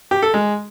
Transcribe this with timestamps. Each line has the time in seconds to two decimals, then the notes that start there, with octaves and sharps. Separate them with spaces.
0.11 G4
0.22 A4
0.34 G#3